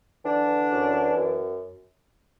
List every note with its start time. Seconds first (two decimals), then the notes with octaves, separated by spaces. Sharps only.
0.25 D3 E3 D4
0.48 E3
0.71 F#2
0.93 E3
1.16 F#2